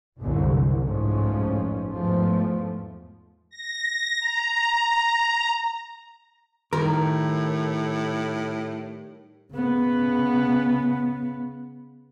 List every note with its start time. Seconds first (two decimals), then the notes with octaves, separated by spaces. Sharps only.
0.20 F#1 C2 D3
0.81 A1 F2 G#2 F3 C#4
1.92 E2 G#2 F3 A3
3.50 A#6
4.20 A#5
6.73 A2 D#3 G3 A#4
9.52 C#3 B3